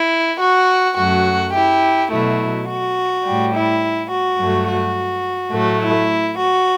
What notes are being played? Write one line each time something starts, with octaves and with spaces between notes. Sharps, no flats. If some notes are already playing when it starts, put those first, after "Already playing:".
Already playing: E4
F#4
F#2 F#3 A3 F#4
E4 G4
B2 F#3 A3 E4
F#4
A2 G3
E4
F#4
G2 F#3 A3
F#4
A2 F#3 A3
E4
F#4